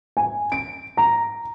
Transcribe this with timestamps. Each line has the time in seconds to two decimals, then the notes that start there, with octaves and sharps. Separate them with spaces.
0.17 G#5
0.52 D7
0.97 A#5